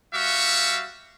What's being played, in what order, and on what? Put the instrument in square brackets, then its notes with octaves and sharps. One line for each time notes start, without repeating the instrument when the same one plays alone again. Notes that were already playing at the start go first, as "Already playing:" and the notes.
[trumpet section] G3 F#4 E5 F5 C#6